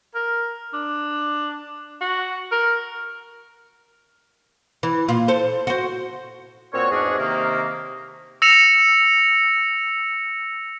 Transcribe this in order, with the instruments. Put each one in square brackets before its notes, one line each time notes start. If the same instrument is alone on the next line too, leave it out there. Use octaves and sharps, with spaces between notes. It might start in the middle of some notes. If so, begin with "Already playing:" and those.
[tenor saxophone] A#4
D4
F#4
A#4
[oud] E3
A#2 F4
A4 C5
F#4 C5
[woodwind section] A#2 C4 F#4 C#5
E2 G#2 C#4 D4 F#4 G#4
C3 D#3 A#3
[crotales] E6 A#6 C#7 E7 F7